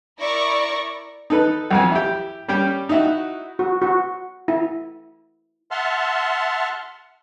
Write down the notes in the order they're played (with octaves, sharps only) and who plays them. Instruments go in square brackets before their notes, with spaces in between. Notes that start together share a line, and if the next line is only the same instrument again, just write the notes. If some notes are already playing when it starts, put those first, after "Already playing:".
[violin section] E4 A#4 D5 C#6 A#6
[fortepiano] D#4 A4 B4
B1 F2 G#5
E4 G4
G3 C#4 G4
D#4 E4 F#4
[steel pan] F#4
F#4
E4
[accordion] E5 F#5 A5 C6 F6